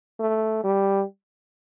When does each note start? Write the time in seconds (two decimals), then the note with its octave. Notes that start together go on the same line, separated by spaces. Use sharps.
0.20 A3
0.64 G3